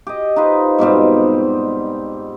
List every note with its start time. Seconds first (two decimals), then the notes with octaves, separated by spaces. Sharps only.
0.07 G4 D#5
0.36 D#4 F4 B4 C5
0.78 G#2 B2 G3 C4